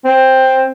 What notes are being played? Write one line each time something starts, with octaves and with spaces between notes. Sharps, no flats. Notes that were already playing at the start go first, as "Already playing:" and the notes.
C4